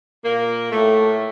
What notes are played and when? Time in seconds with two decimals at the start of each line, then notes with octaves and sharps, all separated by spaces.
0.24 A#2 A#3
0.72 A2 A3